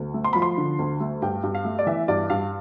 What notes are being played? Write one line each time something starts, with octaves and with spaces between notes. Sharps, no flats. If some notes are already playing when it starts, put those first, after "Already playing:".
Already playing: D2
A3
C6
F3 B5
C6
D3
D2
A3
G2 G5
G2
F5
A3
D5
E3 E5
G2 D5
G2 F5